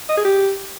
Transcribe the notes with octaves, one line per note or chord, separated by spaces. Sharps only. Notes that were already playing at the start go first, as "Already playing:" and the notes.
D#5
G#4
G4